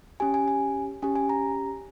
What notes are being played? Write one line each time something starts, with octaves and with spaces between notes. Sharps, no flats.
C#4 G4 G#5
G#5
G#5
C#4 G4 G#5
G#5
A#5